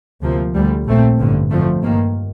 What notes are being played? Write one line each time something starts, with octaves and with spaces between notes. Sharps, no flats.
D2 C3 F3 A#3
D2 D3 G3
A#1 A#2 A3 C4
A1 G2 D3
F2 D3 F3 A3
G2 D#3 A#3